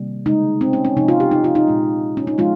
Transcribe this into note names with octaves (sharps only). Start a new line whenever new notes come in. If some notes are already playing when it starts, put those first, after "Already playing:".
Already playing: C3 D#3 G3 A#3
C#3 G#3 D#4
C4
C#4
C#4
C3 F3 G#3 D#4
F4
G4
D#4
F4
D#4
A#2 G#3
C#4
D#4
F3 G#3 F4